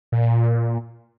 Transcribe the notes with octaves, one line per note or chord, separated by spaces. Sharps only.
A#2